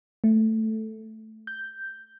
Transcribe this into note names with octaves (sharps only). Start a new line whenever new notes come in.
A3
G6